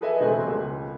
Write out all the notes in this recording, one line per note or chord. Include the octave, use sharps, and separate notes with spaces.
G#4 A4 B4 D#5 E5 G#5
E1 G#3 A3 C4 G#5 F#6
C#2